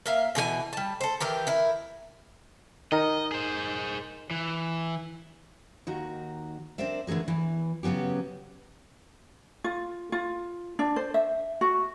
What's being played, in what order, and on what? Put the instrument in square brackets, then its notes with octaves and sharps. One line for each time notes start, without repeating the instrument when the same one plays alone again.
[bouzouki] A#3 E5 F5
B2 E3 G#4 G#5
G3 A5
A4 C5
D#3 E3 G4 A#4
E4 A#4
[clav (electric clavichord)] D#3 D#4 A#4 [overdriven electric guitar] D#5
[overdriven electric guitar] G#4 C5
E3
[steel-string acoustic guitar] D#2 D#3 F#4 A#5
C4 D4 A#4 C5 D5 E5
D3 E3 A3 G#4 A#4
E2 E3
C#3 F#3 B3 C#4 G4
[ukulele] F4
F4
D4
C5
E5
F#4